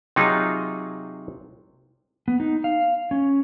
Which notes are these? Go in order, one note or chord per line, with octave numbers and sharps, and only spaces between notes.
C3 F#3 D#4 F4 G#4
B3
D#4
F5
C#4